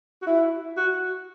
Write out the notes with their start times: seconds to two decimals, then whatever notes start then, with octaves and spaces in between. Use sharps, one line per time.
0.22 F#4
0.27 E4
0.77 F#4